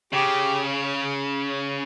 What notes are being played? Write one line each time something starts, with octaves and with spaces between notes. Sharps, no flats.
C#3 G4